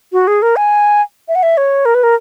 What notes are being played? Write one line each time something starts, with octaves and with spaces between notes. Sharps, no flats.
F#4
G#4
A#4
G#5
E5
F#5
E5
C#5
A#4
B4
A#4